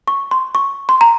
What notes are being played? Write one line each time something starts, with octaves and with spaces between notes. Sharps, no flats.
C#6
C6
C#6
C6
A#5